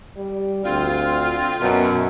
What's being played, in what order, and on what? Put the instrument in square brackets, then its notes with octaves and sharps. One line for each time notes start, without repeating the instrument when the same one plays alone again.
[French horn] G3
[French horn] D2 [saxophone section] C4 F4
[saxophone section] F#2 [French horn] B2